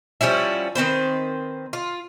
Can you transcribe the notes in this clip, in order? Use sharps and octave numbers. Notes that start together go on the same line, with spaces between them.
F3 G3 C#4 E4
D#3 C4 B4 C5
F4